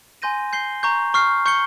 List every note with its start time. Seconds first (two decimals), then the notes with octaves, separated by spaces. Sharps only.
0.22 G#5 C6 G6 A#6 D#7
0.53 G6 C7 G7
0.83 A#5 C#6 G6
1.14 C#6 F6 C7
1.46 C#6 G6 C#7 G7